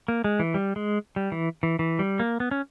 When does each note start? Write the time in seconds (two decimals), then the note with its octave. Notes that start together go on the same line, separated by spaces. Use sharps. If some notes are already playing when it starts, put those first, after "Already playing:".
0.08 A#3
0.24 G#3
0.40 E3
0.54 G3
0.76 G#3
1.16 G3
1.32 E3
1.63 E3
1.79 E3
1.99 G3
2.20 A#3
2.40 B3
2.51 C#4